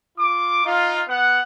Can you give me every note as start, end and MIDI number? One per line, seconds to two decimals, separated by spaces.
0.17 0.64 65
0.17 0.64 86
0.65 1.02 63
0.65 1.02 65
1.08 1.40 59
1.08 1.40 78